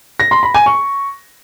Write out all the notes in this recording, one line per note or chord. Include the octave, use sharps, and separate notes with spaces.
A#6
C6
B5
G#5
C#6